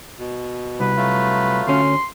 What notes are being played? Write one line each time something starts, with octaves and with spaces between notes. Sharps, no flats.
B2
C2 B4
F#3 A3 F4
D2 C#4 C6